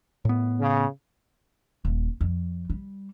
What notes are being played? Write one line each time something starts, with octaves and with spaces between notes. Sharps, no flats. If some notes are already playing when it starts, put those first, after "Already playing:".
A2 B3
C#3
D#1
F2
G3